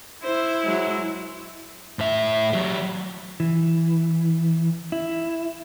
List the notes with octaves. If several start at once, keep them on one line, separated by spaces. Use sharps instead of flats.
E4 C5
F#3 G#3
A2 E5
F#3 G4
E3
E4